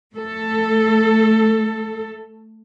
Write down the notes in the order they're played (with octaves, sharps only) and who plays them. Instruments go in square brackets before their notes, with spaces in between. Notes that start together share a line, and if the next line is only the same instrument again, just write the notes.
[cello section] A3 A4